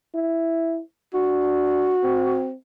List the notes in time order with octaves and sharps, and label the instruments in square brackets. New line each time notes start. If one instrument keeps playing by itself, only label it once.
[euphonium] E4
[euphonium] D4 [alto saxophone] F#4
[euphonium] C4